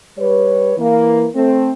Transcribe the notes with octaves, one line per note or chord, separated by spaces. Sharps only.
G3 B4 C#5
E3 A#3
A3 C4